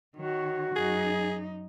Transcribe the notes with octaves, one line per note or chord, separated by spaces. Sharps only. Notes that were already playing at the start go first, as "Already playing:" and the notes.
D#3 F#4 C#5
F#2 D#4 G#4